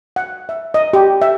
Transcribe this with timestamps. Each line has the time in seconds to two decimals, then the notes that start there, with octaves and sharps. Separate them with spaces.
0.16 F#5
0.49 E5
0.74 D#5
0.93 G4
1.22 E5